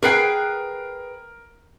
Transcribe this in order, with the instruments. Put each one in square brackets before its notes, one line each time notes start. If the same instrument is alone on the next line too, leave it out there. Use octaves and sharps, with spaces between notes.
[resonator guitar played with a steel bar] G#4 B4 G5 [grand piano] A#4 C7